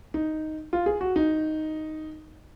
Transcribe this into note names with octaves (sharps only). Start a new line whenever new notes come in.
D#4
F4
G#4
F#4
D#4